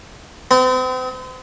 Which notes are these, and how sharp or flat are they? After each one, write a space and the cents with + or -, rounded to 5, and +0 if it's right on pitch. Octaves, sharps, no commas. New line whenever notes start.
C4 -40